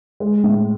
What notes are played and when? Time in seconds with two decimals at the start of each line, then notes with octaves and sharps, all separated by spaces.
0.20 G#3
0.44 A2